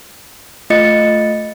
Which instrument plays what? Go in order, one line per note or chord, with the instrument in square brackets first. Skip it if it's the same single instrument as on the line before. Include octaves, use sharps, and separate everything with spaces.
[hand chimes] A3 F4 D#5 A6 C#7